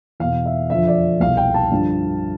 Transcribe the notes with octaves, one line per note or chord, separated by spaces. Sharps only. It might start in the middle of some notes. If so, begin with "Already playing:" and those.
E2 B2 F5
E5
F2 D3 F3 E5
D5
C2 B2 F5
G5
A5
G2 D3 F3